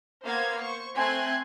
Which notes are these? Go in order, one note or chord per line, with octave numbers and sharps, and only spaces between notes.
A#3 B3 C5 F5 G#6
C5 C#6
A3 C4 G#5 C6 F#6 G#6